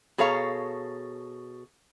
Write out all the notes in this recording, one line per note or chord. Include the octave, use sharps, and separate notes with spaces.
B2 G#4 A4 C#5 F5 A#5